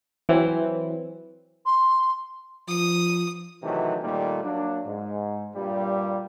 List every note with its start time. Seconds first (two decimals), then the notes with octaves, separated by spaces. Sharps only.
0.29 E3 F#3 C4
1.65 C6
2.68 F3 D#6
3.63 C3 D#3 E3 F#3 A3
4.03 A#2 D#3 G3 A3 A#3
4.44 F#3 A#3 D4
4.86 G#2
5.54 G2 A#2 G3